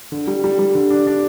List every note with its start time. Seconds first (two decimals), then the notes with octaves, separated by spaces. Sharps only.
0.12 D3
0.27 G3
0.44 G3
0.59 G3
0.75 D3
0.90 D4
1.07 D4